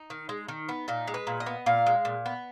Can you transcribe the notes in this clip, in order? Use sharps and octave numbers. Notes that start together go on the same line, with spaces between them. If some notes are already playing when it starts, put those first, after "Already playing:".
Already playing: D#4
D#3
G#3
D#3
B3
A#2 D#4
G#3
B4
A#2
D#5
B3
A#2 F5
G#3
A#2
B3